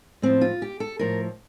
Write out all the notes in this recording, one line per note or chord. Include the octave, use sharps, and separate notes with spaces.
A2 F3 C4
F4
G4
A4
A2 F3 A#4